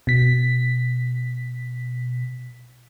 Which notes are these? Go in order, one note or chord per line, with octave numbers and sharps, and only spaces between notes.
B2 B6